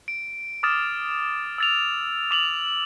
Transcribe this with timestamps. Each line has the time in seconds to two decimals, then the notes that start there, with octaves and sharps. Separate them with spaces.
0.08 D7
0.63 D6 D#6 F6 A6 E7
1.58 E6 A6 F7
2.31 D6 F7 F#7